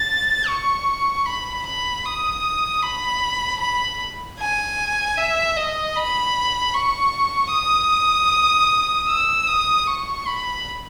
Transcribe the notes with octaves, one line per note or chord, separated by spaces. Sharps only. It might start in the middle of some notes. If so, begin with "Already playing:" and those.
Already playing: A6
C#6
B5
B5
D#6
B5
B5
G#5
E5
D#5
B5
C#6
D#6
E6
D#6
C#6
B5